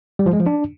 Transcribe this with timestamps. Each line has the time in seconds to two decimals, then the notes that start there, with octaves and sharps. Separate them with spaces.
0.19 G3
0.26 F3
0.33 G#3
0.40 F3
0.46 D4